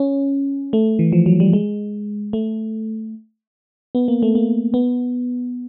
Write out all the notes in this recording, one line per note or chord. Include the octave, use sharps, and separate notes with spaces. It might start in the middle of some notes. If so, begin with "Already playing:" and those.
Already playing: C#4
A3
E3
F3
F#3
G3
G#3
A3
B3
A#3
A3
A#3
B3